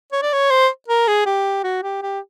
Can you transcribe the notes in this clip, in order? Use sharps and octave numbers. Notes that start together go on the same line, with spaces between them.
C#5
D5
C#5
C5
A#4
G#4
G4
F#4
G4
G4